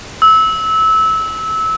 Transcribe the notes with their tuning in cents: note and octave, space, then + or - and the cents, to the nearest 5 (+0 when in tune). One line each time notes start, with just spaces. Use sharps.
E6 -20